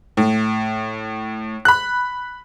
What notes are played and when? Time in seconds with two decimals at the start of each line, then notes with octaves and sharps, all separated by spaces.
0.17 A2
1.65 B5 F#6